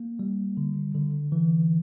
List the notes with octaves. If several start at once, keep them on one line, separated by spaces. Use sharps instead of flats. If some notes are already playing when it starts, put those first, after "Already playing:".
Already playing: A#3
G3
D3
D3
E3